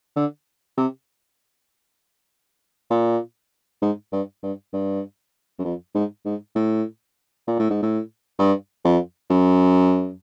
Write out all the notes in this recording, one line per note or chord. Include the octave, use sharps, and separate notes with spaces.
D3
C3
A#2
G#2
G2
G2
G2
F#2
F2
G#2
G#2
A2
A#2
A2
G#2
A2
G2
F2
F#2